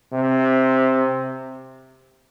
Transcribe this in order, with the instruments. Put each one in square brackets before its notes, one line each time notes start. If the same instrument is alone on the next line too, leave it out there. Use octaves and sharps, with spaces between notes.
[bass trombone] C3